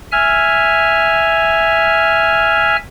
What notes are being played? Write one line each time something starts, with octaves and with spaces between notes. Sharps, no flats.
E5 G#5 F6